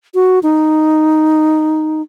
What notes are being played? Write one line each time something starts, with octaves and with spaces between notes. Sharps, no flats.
F#4
D#4